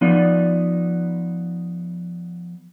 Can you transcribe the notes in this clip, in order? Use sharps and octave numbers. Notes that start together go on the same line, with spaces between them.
F3 B3 D#4 D5